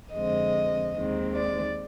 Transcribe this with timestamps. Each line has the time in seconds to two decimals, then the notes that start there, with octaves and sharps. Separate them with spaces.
0.13 F2 D3 G#3 C4 D#5
0.95 D#2 D#3 G#3 C4
1.35 D5